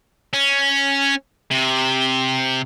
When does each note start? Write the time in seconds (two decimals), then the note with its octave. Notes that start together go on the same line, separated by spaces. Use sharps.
0.33 C#4
1.51 C3